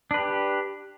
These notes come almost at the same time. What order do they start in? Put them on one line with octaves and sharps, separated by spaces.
D4 B4 G4